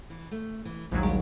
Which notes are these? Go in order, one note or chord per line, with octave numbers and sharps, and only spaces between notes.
E3
A3
E3
A#1 D#2 G#2 F3 F#3
G3 G#3 G4